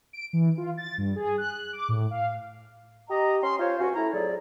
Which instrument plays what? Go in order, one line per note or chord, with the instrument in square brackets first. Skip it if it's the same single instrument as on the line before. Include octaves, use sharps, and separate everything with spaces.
[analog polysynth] D7
E3
F4
A6
G2
G#4
F#6
D6
A2
F5
[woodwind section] G4 D#5 A#5
C#4 C6
F4 C5 C#5
C#2 C3 C#4 F#4
A3 E4 A#5
F2 A2 F#3 G#4 A4 D5